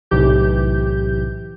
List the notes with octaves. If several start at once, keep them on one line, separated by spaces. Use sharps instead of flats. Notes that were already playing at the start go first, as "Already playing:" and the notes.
B1 A2 C3 E3 G4 G6